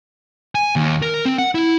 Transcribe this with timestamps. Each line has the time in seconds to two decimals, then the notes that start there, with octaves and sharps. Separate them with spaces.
0.55 G#5
0.76 D#2
1.02 A#4
1.25 C4
1.38 F#5
1.55 E4